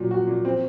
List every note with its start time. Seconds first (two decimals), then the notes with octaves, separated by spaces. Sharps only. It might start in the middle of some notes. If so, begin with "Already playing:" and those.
Already playing: A#2 F#3
0.11 F#4
0.27 A#2
0.45 C4